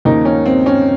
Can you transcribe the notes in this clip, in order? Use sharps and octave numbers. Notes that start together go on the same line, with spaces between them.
D#2 C#3 F3 A#3 D#4
C#4
C4
C#4